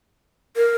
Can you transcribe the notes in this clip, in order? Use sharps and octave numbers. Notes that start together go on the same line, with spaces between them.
A#4